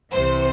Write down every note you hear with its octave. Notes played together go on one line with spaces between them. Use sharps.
C2 C3 E3 C5